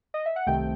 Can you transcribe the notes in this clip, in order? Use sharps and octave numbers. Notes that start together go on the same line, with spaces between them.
D#5
E5
F#5
C2 C3 D#3 A3 G5